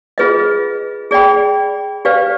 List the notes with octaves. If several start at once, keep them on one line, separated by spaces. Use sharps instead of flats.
F4 G#4 B4 D#5
G#4 D5 G5 B5
G4 B4 D5 F5